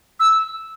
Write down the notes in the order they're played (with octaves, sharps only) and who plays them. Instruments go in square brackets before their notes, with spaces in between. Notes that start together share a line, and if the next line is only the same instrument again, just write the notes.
[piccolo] E6